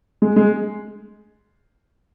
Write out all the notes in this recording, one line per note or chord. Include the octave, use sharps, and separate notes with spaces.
G#3
G#3